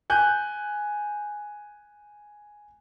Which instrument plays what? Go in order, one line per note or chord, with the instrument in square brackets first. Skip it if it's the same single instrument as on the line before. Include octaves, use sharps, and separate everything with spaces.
[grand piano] G#5 F#6 G6